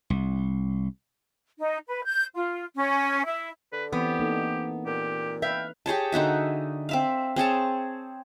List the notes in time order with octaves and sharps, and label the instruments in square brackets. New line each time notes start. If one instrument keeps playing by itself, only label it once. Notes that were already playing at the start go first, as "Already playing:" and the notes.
[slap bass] C2
[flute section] D#4
B4
G6
F4
C#4
E4
[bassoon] D3 [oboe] B4
[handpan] E3 C4 [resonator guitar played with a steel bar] B3 [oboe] G4
[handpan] A#3 D#4 A4
[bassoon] A#2 [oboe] G4
[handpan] B4 [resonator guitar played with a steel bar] E5 F5 [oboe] G5
[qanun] G4 G#4 C#5 A5
D3 D#4 F#4 E5
C4 E5 F5
C4 G#4 C#5 A5